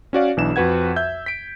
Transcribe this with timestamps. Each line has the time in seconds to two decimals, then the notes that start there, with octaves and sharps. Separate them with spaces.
0.13 C#4 F#4 D5 F5
0.37 B1 E3 D4 E7
0.56 F2 F#4 B4 F#5 G#6
0.96 E5 G6
1.26 B6 D7